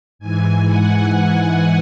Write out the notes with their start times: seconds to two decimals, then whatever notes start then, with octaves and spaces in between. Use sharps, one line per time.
0.19 G#2 E3 G#5
0.65 F#5